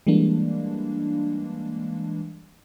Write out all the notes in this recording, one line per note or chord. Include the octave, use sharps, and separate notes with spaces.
E3 G3 G#3 A#3 D4